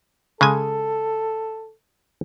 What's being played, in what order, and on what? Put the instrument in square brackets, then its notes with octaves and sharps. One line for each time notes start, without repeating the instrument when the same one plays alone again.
[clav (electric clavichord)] C#3 G#3 G#5 [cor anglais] A4